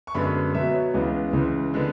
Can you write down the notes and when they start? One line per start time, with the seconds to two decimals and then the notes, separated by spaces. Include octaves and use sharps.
0.07 C#6
0.14 F#2 D3 G#3 B3 B5
0.54 B2 F#3 B3 E5
0.74 C#5
0.94 C#2 C#3 E3 G#3 B3
1.33 C#2 C#3 E3
1.74 D3 G#3 B3